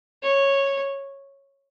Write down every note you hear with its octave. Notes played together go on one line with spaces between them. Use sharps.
C#5